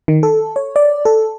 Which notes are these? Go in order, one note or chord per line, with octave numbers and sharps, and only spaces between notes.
D#3
A4
C#5
D5
A4